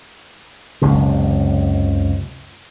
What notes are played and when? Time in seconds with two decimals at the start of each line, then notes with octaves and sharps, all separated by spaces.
0.82 F#1 C#2 C3